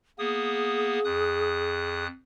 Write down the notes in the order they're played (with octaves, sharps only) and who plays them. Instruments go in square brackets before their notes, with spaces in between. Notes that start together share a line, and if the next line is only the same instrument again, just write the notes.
[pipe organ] A#3 B3 D#6 [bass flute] G#4
[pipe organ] F2 D#6 F#6